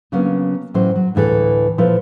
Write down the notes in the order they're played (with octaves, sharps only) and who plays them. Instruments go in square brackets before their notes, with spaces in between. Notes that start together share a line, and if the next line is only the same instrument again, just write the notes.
[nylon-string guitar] C#3 F#3 A#3 B3 C#4 D4
A2 E3 F#3 C#4 C5
F#3
D2 A2 E3 A4 B4
A#2 F3 E4 A4 B4